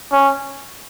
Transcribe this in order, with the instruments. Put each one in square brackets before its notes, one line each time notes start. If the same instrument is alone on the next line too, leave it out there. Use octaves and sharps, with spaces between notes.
[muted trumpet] C#4